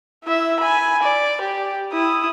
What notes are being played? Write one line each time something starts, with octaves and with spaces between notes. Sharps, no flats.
E4 E5
G#5 B5
D5
G4
E4 D#6